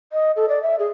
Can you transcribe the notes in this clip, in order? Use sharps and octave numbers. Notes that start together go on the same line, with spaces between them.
D#5
A4
D5
E5
G#4